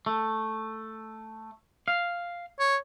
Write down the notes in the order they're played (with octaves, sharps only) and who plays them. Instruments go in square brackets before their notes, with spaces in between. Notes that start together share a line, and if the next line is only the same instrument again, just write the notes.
[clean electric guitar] A3
F5
[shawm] C#5